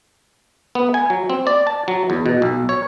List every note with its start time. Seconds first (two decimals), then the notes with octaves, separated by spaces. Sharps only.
0.75 B3
0.94 G#5
1.10 F#3
1.30 C4
1.47 D5
1.67 A5
1.88 F#3
2.10 E2
2.26 B2
2.42 B1
2.69 C#5